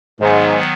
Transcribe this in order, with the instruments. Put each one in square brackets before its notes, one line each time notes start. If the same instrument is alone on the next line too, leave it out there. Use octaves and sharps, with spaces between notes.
[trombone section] G#2 [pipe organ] D#3 F#3 B3